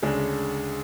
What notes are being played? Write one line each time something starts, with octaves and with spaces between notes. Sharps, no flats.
D2 C#3 G#3 D4